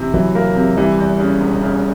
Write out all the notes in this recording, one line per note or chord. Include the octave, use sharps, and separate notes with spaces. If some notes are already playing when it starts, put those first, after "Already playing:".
Already playing: C3 E3
E3 F#3
A#3
C3
E3 G3
E2
C#3
E1
C#3